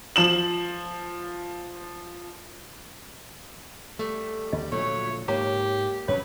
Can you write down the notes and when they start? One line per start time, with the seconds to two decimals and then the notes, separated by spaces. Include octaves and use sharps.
0.16 F3 E7 F#7
3.99 G3 A3
4.53 D2 D#5
4.72 A#2 D3 F3 F#3 A3 C#5
5.28 G#2 A#3 G4 C#5 A#5
6.08 F2 F#3 C#4 B4 C#5